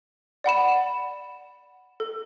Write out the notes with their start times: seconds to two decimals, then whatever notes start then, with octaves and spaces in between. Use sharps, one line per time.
0.44 D5 F#5 B5 E7
2.00 A4